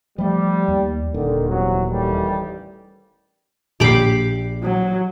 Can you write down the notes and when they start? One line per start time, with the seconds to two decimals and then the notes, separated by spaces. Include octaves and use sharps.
0.18 F3 G3 A3
0.68 D#2
1.14 D#1 D3 D#3
1.48 E2 C3 F#3
1.88 A1 D#3 G3
3.80 A#1 G4 B5 D6 C7
4.63 F#3